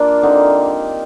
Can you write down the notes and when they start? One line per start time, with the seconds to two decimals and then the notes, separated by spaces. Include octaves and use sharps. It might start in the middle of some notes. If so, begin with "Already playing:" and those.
Already playing: A#3 D4 F4
0.23 D3 G3 C4 D#4